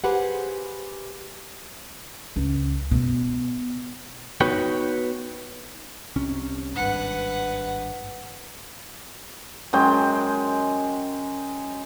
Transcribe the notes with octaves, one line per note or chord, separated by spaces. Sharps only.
G4 G#4 B4 C5 F#5
C#2
B2
B3 D#4 F#4 B4 C#5 G5
C2 C3 C#4
G#1 G2 B4 F#5
F#2 G#3 G5